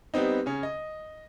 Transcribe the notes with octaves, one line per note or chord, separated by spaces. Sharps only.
G3 B3 C4 D#4
C#3 C#4
D#5